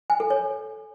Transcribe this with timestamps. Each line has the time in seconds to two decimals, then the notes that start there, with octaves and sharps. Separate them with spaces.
0.10 G#5
0.20 A4
0.30 C#5